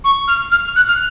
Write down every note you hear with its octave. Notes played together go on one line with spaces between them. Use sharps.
C#6
F6
F6
F#6
F6